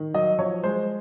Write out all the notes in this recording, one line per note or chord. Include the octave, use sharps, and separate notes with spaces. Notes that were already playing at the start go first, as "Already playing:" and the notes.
Already playing: D#3
F#3 D#5
F3 C#5
G#3 C5